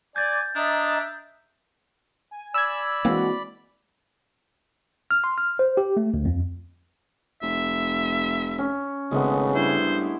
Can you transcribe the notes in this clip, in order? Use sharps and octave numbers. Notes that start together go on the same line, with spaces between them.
D5 G#5 D6 G6 A6
D4 D#5 E5 A#5 D#6
G#5
D5 B5 E6 G#6
E3 G#3 A#3 C4 F#4
F6
C6
F6
C5
G4
A3
D2
F2
F1 E5
C#4
G#1 C#3 G#3 A3 B3
G2 E4 C5